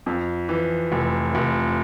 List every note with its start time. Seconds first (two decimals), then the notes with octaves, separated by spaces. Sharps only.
0.06 F2
0.49 E3
0.92 F1
1.35 F1